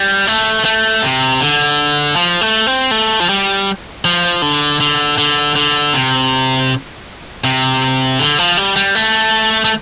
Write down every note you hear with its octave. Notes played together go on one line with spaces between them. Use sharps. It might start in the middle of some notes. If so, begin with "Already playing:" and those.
Already playing: G3
A3
A3
C3
D3
F3
A3
C4
A3
F3
G3
F3
D3
D3
D3
D3
C3
C3
D3
F3
G3
G3
A3
A3